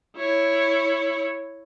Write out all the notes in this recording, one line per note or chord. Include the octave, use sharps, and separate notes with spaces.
E4 C#5